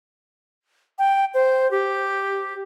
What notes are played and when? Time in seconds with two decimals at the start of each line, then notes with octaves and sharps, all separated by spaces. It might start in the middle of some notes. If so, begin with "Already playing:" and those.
0.99 G5
1.34 C5
1.71 G4